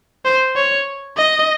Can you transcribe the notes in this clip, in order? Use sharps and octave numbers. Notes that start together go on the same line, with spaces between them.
C5
C#5
D#5